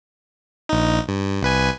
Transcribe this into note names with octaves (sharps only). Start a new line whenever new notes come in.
A#1 D#4
G2
C2 B4 G#5